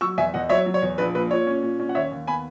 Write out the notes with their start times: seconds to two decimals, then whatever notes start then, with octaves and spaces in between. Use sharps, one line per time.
0.01 F#3 C#6 E6
0.18 E2 E5 G#5
0.34 E2 D#5 F#5
0.49 F#3 C#5 E5
0.66 F#3
0.74 C#5
0.82 E2
0.98 A#1 B4
1.15 A#2 B4
1.31 A#2 C#5
1.47 C#4
1.62 A#2
1.80 C#4
1.89 F#5
1.95 D#2 C#5 E5
2.12 D#2
2.27 B3 G#5 B5